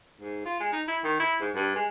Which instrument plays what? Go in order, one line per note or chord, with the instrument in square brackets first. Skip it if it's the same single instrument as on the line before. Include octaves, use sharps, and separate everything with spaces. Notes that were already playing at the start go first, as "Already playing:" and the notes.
[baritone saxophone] G#2
F4
G#3
D#4
E4
D#3
E4
G#2
G2
G#3